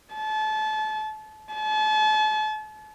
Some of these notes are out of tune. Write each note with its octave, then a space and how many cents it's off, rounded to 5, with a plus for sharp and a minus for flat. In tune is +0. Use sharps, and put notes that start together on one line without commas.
A5 -30
A5 -40